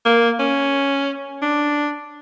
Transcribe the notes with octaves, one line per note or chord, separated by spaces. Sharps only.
A#3
C#4
D4